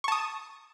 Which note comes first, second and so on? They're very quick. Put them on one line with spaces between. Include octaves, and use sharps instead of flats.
C#6 A5 D#6